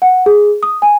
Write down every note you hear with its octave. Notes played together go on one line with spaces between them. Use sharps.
F#5
G#4
D#6
G#5